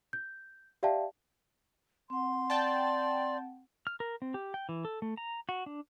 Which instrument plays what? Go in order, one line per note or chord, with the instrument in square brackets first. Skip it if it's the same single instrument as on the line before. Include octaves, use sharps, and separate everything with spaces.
[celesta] G6
G4 D5 E5 F5 G5 A5
[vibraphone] C4 F#5 [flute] C6
[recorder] D5 [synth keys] G5 A5
[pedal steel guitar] F6
A#4
C4
G4
G5
E3
A4
A3
A#5
F#4
D4